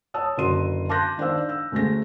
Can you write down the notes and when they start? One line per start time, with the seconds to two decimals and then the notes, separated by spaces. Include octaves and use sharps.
0.14 C#5 A5 D#6 E6
0.37 F#1 D3 F#4 C6 D#7
0.89 A5 C6 D6 F#6 G6 A#6
1.18 D#3 D4 C5 F5 E6
1.49 E6
1.72 D2 A3 C#4 G#4 A#6